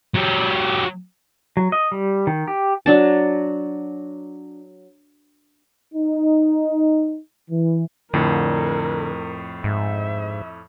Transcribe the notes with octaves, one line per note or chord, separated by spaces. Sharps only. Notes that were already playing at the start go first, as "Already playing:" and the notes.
F#3 G4
F#3
D#5
G3
D#3
G4
F#3 D4 A5
D#4
E3
F2 A2 D3 A#4
G#2 E5